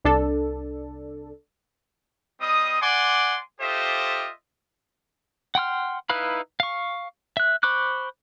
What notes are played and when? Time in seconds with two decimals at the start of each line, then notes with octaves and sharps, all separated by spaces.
0.05 C2 D4 A4
2.41 G3 C4 D#5 D#6
2.81 D5 F#5 G#5 C6 D6
3.60 F4 G4 A4 C5 D#5 E5
5.55 F#5 G5 C6 F6
6.10 D#4 E4 B4 F5 B5
6.60 F5 C#6
7.37 E5 F#6
7.63 C5 B5 C#6 D6 F#6